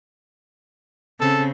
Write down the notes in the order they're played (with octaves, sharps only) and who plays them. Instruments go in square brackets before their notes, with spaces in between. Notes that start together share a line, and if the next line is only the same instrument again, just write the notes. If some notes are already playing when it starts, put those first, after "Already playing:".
[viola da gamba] C#3 C4 [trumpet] A4